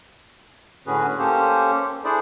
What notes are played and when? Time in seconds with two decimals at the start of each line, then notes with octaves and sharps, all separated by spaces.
0.87 A2 D3 C#4 F#4 G#4 B4
1.19 A#3 C#4 G4 A4 C5
2.04 D4 E4 G#4 A4 C5 D5